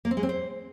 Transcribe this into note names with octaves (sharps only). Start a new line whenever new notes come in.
A#3
C4
G#3
C4
C5